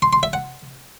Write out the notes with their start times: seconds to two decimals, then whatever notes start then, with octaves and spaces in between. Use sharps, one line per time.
0.02 C6
0.13 C6
0.23 E5
0.33 F#5